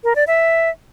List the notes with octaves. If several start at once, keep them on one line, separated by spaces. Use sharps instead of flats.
A#4
D5
E5